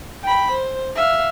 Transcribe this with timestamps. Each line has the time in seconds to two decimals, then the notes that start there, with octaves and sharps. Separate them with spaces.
0.23 G5 B5
0.52 C5
0.96 E5 F5